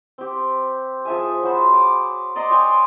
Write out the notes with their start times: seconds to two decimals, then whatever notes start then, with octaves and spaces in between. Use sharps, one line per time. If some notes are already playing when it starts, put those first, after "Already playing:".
0.18 C4 G4
1.05 F3 G#4 E5 G#5
1.43 F#3 F#4 C5 B5
1.73 D6
2.35 D5 D#5 A#5 C6
2.50 C#5 G5 G#5 C6